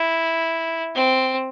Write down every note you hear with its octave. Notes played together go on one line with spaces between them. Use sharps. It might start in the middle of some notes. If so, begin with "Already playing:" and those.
Already playing: E4
C4